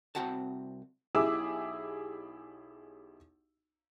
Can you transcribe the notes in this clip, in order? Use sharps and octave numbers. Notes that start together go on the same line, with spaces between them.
C2 C4 F#4 F#5 A5
B1 E4 G4 G#4 D6 E6